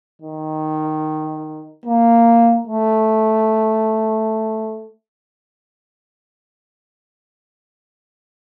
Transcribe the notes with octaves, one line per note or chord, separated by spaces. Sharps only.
D#3
A#3
A3